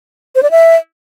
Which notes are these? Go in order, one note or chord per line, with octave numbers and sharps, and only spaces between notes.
C5
D5
E5